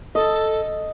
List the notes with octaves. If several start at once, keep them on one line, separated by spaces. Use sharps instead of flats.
A4 D#5